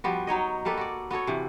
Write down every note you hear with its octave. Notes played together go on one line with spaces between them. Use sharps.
F3 G3 B3 F#4
F#3 D#4 C#5 D#5
G3 A#3 A4 B4
F#4 D5
B3 F#4 A4 C#5
C3 E3